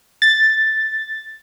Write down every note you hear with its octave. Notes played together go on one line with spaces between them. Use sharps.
A6